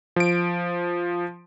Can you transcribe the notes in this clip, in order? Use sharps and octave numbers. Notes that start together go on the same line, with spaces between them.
F3 D7